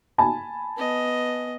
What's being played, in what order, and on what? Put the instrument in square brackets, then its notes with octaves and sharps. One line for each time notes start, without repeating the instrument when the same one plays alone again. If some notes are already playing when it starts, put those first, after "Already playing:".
[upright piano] G#5 A5 B5
[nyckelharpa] B3 D#5